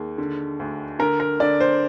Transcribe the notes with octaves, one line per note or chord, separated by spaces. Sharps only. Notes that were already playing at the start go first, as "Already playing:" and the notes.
Already playing: D#2 G#4
D3
D2
D3 A#4
A#4
D3 D5
C5